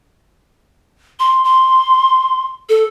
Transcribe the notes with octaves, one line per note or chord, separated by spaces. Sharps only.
C6
C6
A4